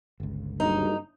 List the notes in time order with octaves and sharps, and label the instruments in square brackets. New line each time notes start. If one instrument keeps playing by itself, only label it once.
[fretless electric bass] G1 C#2
[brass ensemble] F#1 G2 [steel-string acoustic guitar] D#4